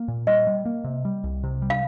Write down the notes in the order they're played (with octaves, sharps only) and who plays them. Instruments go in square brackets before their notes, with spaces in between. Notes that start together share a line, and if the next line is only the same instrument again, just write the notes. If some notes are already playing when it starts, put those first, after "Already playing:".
Already playing: [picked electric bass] A#3
A#2
[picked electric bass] G3 [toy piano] D#5
[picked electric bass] G3
A#3
C3
G3
C2
C3
G3
[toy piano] F5